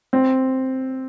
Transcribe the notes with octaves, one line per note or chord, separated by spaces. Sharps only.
C4